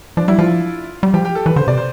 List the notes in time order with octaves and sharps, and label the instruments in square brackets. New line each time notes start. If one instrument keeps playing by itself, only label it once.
[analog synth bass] F3 [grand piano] D4
[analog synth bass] G3 [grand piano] E4
[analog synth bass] F3 [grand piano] F4
[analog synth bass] G3
[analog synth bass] F3 [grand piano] G4
[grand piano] G4
A4
[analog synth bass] E3 [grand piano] B4
[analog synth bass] D3 [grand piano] C5
[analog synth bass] C3 [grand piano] D5
[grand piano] C5